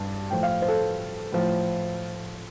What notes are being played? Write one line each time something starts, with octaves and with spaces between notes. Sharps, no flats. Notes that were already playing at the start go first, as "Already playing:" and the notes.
Already playing: G2 A5
A2 F3 G5
F5
C5
A4
A2 F3